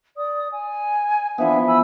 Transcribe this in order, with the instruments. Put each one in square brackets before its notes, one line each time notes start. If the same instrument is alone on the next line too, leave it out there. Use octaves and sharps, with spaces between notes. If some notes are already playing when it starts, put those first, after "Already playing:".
[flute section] D5 D#6
G#5
[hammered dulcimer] E3 F3 B3 [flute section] D4 E5 F5
[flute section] G#5 B5 E6